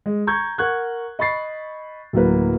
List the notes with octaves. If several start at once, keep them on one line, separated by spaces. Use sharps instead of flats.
G#3
A#5 C#6 G6 G#6
A#4 F#5 C#6 F#6 G#6
D#5 B5 C#6 A6 C7
D1 F#3 A#3 B4